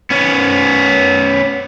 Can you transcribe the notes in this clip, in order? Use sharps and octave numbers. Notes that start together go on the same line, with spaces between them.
B3 C#4